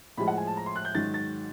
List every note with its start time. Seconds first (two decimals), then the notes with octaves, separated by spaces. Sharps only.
0.17 A2 F3 G#3 B5
0.28 F#5
0.38 G#5
0.47 A5
0.57 A#5
0.66 C6
0.76 F#6
0.85 G6
0.95 G#2 D#3 F#3 A6
1.14 A6